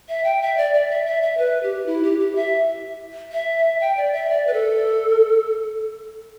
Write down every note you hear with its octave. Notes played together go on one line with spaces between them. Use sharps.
E5
G5
E5
D5
D5
E5
E5
E5
B4
G4
E4
G4
G4
E5
E5
G5
D5
E5
D5
B4
A4